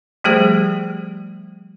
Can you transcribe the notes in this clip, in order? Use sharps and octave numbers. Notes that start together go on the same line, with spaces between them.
F3 G3 A3 G4 G#4 C5